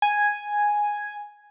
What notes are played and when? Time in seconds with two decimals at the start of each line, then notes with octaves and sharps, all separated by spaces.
0.02 G#5